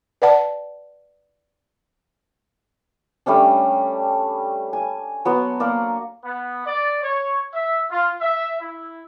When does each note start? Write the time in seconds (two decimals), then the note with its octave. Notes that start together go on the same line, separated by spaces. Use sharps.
0.22 B4 D5 F#5 A5
3.26 G3 A3 C#4 D4
4.73 G#5
5.25 F#3 B3 F#4 C6
5.60 A#3 A#4 D5
6.24 B3
6.65 D5
7.02 C#5
7.54 E5
7.90 F4
8.21 E5
8.60 E4